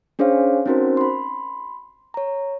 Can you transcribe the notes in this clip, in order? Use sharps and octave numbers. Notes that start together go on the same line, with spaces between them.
C#4 D4 G#4 C5 C#5 F5
C4 C#4 D#4 F#4 A#4 C5
B5 C6
C#5 A#5